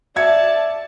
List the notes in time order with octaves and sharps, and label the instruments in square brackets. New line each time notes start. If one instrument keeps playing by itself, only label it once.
[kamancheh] D5 A5 [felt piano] E5 G#6 C#7